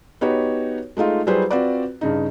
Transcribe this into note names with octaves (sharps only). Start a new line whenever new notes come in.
B3 D#4 F#4 G4 B4 C#5
G#3 A3 D#4 F4
F#3 G3 E4 G#4 B4 C5
C4 F4 F#4 B4 D5
G2 C#3 D#4